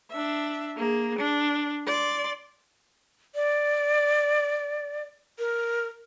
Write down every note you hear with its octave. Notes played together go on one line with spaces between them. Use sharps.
D4 E5
A#3 G#4
D4
D5 C6
D5
A#4